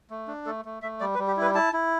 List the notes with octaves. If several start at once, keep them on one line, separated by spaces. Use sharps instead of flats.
A3
D4
A3 A4
A3
A3 E5
G3 D5
B4
G3
G4
E4 B4
E4 A5
E4